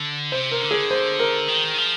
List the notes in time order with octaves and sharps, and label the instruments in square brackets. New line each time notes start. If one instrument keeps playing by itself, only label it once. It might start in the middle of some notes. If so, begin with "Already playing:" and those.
Already playing: [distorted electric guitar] D3
[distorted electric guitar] C3 [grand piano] C5
[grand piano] A#4
[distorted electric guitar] D3
[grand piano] G#4
C5
A#4
[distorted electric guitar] D#3
F3